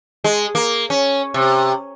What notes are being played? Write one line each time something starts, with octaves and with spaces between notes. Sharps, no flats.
G#3
A#3
C#4
C3